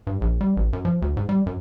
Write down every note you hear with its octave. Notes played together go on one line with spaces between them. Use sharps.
G2
A#1
G3
A1
F#2
F3
D2
G#2
G3
F#2